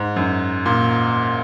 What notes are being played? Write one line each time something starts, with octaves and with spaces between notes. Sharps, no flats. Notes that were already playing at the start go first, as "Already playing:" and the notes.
Already playing: G#2
F#2
A#2